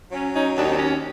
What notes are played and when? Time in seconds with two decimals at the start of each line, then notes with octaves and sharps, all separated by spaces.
0.12 F#3 C#4
0.33 C#4 D#4
0.55 D#2 D4
0.63 D#4
0.69 C4 D4
0.77 C#4